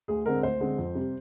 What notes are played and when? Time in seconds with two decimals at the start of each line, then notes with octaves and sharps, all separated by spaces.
0.08 D2 G#4
0.26 D3 G#3 C4 A#4
0.43 D2 C5
0.60 D3 G#3 C4
0.78 F2
0.95 C3 G3